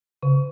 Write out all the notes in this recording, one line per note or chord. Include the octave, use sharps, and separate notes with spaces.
C#3